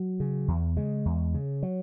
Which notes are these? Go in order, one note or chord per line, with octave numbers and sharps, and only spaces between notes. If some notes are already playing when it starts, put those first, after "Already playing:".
Already playing: F#3
C#3
E2
C#3 G#3
E2
C#3
F#3